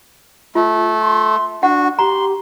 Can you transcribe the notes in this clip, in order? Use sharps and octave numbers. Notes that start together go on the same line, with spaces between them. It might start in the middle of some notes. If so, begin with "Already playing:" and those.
A3 F4
C6
D4 F#4 F#5
G4 A#5 C6